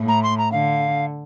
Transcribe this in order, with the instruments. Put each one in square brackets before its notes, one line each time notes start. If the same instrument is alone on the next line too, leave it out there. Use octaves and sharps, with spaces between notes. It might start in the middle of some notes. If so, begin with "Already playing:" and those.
Already playing: [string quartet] A2
[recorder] A#5
C6
A#5
[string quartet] D3 [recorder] F5